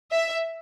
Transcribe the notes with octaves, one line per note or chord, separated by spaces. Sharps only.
E5